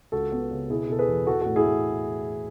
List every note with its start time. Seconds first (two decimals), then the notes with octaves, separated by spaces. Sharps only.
0.12 C#2 F#4 A4
0.32 B3
0.51 C#3
0.70 B2 E4 G#4
0.89 B2 A4
0.99 G#4 B4
1.08 E2
1.27 E3 F#4 A4
1.41 A2 F#4 A4
1.56 E4 G#4
1.65 A2